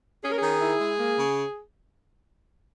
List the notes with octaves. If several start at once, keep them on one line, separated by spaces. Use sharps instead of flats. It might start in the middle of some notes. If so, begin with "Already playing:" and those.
C#4 G#4
A#4
D#3 G#4
E4
G#3
A#3
C#3